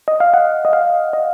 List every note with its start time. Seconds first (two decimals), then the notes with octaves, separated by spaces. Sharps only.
0.08 D#5
0.20 F5
0.34 F#5
0.65 D#5
0.73 F5
1.13 D#5